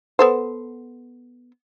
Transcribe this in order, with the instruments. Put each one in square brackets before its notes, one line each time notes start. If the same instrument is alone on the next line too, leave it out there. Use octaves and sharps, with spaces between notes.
[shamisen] B3 A4 C5